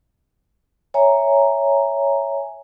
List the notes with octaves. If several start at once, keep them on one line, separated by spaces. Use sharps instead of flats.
C#5 E5 G#5 A#5